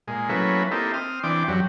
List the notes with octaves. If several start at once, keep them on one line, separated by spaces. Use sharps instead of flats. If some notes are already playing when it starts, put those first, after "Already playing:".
A#2 G#3
F#3 A3 A#3 C#4 E4 B4
A#3 C4 D#4 E4 G4 A4
C4 D#6 F6
E3 C4 D4 G5 D6
F#2 F#3 G4